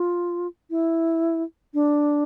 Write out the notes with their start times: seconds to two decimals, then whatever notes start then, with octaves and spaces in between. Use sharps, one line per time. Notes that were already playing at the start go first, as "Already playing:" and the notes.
Already playing: F4
0.70 E4
1.74 D4